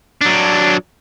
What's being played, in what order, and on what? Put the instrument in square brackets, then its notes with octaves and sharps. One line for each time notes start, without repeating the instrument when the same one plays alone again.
[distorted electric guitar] F#3 D4